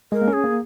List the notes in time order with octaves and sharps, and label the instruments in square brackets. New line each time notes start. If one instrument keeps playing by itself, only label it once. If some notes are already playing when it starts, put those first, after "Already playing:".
[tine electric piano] G#3 [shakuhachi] A#4
[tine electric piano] A#3
C#4
[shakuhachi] G#4
[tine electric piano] A#3